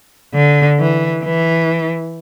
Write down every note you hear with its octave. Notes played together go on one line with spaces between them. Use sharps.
D3
E3
E3